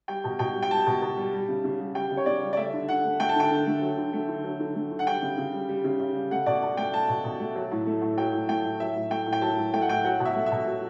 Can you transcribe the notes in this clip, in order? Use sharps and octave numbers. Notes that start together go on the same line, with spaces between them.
G3 G5
B2
B2 G5
G3
G5
G3 A5
B2
B2
G3
G3
C#3
C#3
G3
G3 G5
C#3
C#5
C#3 D5
G3
D5
A3 E5
D3
D3 F#5
A3
A3 G5
A5
D3 G5
D3
A3
F#3
D3
A3
D3
F#3
D3
A3
D3
F#5
G3 G5
C#3
C#3
G3
G3
C#3
C#3
G3
A3 F#5
B2 D5
B2
A3 G5
A3 A5
B2
B2
A3
F#3
A2
A3
A2
F#3 G5
A2
A3 G5
A2
F#3 E5
A2
A3 G5
A2
G5
F#3 A5
A2
A3 G5
F#5
A2 G5
F#3 F#5
B2
E5
A3
B2 E5
F#3